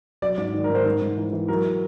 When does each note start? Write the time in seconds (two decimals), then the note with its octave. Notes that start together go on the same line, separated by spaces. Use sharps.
0.22 F#3 D5
0.38 G#2 D5
0.54 D#3
0.64 A#4
0.70 G#2
0.75 C5
0.86 G#2
1.02 G#2
1.17 E3
1.33 E3
1.48 F#3 A#4